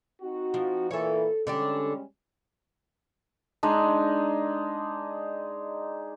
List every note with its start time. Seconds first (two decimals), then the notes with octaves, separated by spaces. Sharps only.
0.21 C4 D#4 F#4
0.54 F3
0.91 A#2 E3 A4 C#5
1.47 D3 G3 G#3 C#4 D4 G4
3.63 G#3 D4 D#4